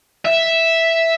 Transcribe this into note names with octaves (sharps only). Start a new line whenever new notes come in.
E5